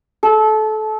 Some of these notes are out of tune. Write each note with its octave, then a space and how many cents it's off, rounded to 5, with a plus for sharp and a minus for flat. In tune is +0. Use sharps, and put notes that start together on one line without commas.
A4 -25